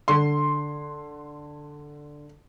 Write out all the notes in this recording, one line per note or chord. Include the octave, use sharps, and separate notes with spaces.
D3 C6